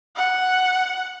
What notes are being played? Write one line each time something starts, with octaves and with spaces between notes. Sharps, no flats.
F#5